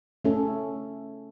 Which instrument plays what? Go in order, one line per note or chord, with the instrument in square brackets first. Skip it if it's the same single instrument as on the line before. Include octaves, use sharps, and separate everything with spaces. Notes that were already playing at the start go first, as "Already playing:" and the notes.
[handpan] A3 C#4 A4